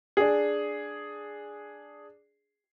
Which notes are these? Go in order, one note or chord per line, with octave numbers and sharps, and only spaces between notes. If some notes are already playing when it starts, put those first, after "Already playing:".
D4 G#4